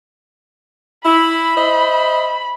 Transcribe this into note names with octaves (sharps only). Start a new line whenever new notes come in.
E4 B5
C5 D#5 E5